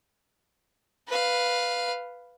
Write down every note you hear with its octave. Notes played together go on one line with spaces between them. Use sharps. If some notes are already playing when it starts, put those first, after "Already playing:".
B4 F5